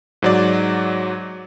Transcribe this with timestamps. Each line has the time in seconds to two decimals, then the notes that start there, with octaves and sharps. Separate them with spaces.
0.22 G#2 F#3 D5